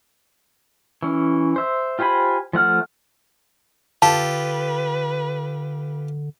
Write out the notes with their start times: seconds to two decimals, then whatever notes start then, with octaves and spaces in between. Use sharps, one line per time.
1.02 E3 C#4
1.56 C5 E5
1.99 F4 G4 C5 G#5 B5
2.53 F3 A3 F#5 F6
4.02 D3 F4 G4 A4 B4 A5